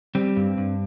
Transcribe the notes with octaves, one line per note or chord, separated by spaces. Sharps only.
G3 C4
G2
G2